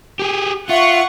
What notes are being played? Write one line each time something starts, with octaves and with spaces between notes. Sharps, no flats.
G4 G#4
F4 E5 F#5 C#6